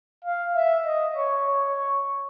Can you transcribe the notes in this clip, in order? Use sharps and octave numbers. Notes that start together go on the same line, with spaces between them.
F5
E5
D#5
C#5
C#5